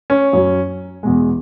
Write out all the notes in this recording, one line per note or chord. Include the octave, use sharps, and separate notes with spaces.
C#4
F#2 F#3
E2 B2 G#3